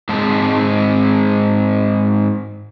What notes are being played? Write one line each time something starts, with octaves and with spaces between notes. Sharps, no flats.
G#2 G#3 C4 A5